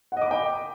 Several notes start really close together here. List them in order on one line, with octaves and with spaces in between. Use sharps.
F#5 D#5 D6 B5 G5